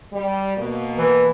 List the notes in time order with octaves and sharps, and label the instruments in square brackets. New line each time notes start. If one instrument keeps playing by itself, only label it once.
[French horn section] G3
B2 A#3
[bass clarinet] E3